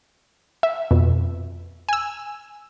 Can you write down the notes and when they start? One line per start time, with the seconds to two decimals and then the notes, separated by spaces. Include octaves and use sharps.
0.63 E5
0.91 F2 B2
1.89 G#5 E6